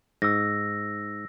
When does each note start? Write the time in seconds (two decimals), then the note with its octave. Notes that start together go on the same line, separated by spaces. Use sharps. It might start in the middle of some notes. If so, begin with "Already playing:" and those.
0.22 G#2 E6 A#6